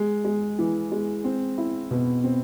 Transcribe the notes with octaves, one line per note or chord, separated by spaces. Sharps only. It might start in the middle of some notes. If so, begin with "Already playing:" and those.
Already playing: G#3
G#3
E3
G#3
C4
E4
B2
C4